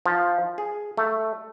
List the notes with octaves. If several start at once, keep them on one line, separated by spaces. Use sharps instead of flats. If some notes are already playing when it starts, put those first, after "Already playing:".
F3
G#4
A3